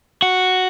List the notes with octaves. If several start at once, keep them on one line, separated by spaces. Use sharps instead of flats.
F#4